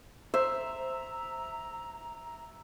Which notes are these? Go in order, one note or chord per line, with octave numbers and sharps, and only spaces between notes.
C5 E5 A#5